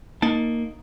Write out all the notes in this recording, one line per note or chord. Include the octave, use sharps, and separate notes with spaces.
A#3 D#4 A5